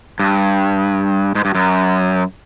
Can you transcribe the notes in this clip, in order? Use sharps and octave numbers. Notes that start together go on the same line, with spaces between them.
G2
G#2
G2
F#2